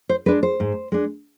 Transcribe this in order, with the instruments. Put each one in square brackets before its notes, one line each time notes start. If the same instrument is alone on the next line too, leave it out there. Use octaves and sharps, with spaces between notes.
[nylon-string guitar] C5
G#3 D4 B4
C5
G#2
G#3 D4